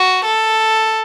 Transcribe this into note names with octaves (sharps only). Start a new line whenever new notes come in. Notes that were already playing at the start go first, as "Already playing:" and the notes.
Already playing: F#4
A4